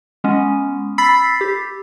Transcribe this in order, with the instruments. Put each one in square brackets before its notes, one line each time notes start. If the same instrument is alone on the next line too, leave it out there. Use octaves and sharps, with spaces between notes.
[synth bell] G#3 B3 C#4
B5 E6 A6 B6 C7
G4